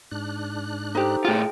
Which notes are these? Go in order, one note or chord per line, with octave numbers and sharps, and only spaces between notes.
G#2 D4 F#6
D#4 G4 A4 C5 A#5
A2 F4 G#4 G5